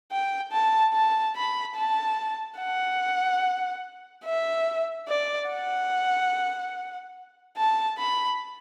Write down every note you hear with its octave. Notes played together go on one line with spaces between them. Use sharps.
G5
A5
A5
B5
A5
F#5
E5
D5
F#5
A5
B5